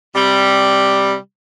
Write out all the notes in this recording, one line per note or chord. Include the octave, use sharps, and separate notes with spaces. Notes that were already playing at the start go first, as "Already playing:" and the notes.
C3 G3